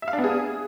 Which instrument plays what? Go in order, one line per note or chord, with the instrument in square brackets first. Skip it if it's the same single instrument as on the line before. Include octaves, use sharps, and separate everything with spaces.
[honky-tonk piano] E5
F5
D4
B3
G#4